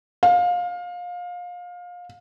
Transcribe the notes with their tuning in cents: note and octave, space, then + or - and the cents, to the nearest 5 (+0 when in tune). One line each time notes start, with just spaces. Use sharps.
F5 +25